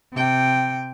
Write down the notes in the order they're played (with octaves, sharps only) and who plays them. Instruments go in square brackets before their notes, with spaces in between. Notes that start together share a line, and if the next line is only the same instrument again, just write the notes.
[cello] C3 G5